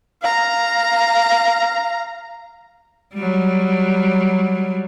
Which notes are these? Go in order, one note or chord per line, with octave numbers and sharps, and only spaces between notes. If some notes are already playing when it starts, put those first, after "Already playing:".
F5 A#5
F#3 G3